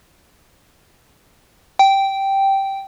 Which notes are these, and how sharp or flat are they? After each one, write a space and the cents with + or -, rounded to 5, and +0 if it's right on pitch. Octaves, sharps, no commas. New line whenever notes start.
G5 -10